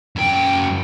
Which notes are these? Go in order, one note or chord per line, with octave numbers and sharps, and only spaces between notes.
F#2 G5